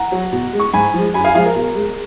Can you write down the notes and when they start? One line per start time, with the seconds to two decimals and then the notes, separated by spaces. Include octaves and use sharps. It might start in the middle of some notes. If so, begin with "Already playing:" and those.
Already playing: F#5 A#5
0.12 F#3
0.33 B2
0.53 G#3
0.60 C#6
0.73 G#2 G#5 B5
0.94 F3 G#3
1.14 F#2 G#5 B5
1.24 F5 G#5
1.34 F3 G#3 F5 G#5
1.45 A#4
1.56 B2
1.75 G#3